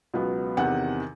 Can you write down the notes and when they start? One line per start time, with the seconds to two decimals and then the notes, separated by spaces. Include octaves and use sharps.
0.14 C#2 B2 F#3 B3
0.57 E2 C3 D#3 F#5